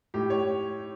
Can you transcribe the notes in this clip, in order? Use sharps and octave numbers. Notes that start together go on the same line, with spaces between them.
A2 G4
C#5